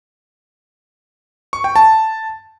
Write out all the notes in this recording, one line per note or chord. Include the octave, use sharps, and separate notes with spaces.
C#6
G5
A5